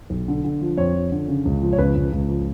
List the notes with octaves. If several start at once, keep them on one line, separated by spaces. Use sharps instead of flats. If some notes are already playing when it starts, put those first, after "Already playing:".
B1
D3
D3
F3
F2 C#5
F3
D3
C#3
C#2
F3
C#5
C#2 B4
C#2
C#2
F3